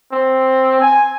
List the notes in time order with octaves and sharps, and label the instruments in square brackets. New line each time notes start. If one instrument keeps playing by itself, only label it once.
[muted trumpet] C4
G#5